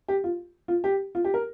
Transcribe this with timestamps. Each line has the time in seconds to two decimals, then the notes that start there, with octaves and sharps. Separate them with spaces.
0.08 G4
0.24 F4
0.68 F4
0.84 G4
1.15 F4
1.25 G4
1.34 A#4